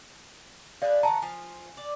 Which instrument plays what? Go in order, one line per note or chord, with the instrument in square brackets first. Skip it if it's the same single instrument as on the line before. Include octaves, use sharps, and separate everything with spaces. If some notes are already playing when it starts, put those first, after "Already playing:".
[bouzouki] D4 G#4 B4 [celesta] D5 F5
[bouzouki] D#3 F#5 [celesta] A5 A#5
[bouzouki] F3 F4 [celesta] G#5
[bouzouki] D5